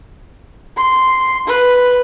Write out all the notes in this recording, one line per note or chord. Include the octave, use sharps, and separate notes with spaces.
C6
B4